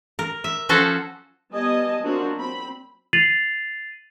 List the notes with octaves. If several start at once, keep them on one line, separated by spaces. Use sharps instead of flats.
A#4
E5
F3 C#4 F#4 A4 C5
G3 B3 D#5 G#5 A5
F#3 A#3 C4 D4 F4 F#4
C4 B5
A6 C7 D#7 F7 F#7